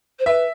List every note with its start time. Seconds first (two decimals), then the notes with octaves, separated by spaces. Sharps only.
0.19 C5
0.26 B4 E5